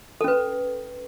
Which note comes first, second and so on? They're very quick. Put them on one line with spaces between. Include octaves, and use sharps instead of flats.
A4 C#4 B4